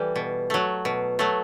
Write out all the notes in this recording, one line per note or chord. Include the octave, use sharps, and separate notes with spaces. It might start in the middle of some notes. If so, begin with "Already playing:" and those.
Already playing: E3 G3 A4
B2
F#3 A3
B2
F#3 A3